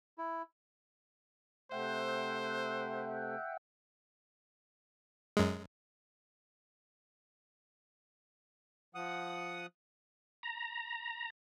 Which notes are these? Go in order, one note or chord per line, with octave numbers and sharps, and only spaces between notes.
E4
C3 A3 C5 E5 F#5 G5
F#2 G#3
F3 F#5 D#6
A#5